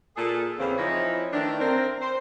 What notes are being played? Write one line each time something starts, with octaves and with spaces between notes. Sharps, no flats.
A#2 G#4 A4
E2 C#3 C4
E3 F3 C4 D#4 E4 C#5
D#3 E3 A3 D4
C4 A#4
C5